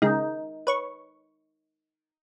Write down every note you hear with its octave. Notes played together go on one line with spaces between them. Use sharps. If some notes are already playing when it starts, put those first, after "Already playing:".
C#3 G#3 D#4
B4 C#5 C#6